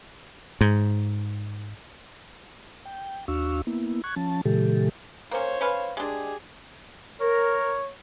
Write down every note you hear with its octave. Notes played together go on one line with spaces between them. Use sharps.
G#2
G5
D#2 D4 F#4 F5 C#6 E6
A#3 B3 E4
C#6 F#6 G#6
F3 C#4 A5
A#2 C#3 E3 G#3 G4 A4
A#3 C#4 C5 C#5
C#4 B4 F5
G#3 D4 G4 G#4
A#4 C#5